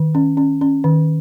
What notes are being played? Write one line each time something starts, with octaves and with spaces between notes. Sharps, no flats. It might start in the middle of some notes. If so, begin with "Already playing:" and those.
Already playing: D#3
C#4
C#4
C#4
D#3